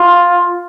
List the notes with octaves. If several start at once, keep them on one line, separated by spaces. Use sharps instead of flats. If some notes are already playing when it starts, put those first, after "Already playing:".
Already playing: F4